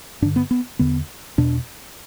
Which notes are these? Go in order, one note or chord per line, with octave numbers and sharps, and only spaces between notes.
G2 D3 D4
B3
B3
E2 D3 B3
E2 B2 D4